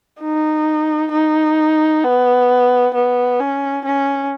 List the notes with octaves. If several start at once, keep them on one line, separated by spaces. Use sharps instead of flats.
D#4
D#4
B3
B3
C#4
C#4